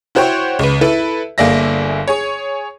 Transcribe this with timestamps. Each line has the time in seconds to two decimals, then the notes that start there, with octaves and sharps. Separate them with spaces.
0.15 E4 F#4 C5 C#5 G5
0.59 C#2 B4
0.81 E4 A4 B4
1.38 G1 A#3 G#4 D5 E5 A#6
2.08 G#4 C#5